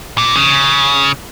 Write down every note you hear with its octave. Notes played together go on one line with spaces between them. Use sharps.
A#2
C#3